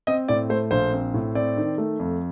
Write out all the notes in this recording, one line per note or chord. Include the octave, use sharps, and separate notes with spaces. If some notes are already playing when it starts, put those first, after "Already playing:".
C4 D#5
A2 D5
A3 C5
A#1 C5
C4
A2
C4 D5
D#3
A3
F2